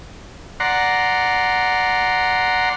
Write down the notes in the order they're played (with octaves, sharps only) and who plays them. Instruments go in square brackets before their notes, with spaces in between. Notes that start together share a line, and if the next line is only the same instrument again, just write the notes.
[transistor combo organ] D5 F#5 A#5 C6